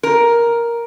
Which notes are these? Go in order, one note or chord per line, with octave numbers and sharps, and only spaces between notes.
A#4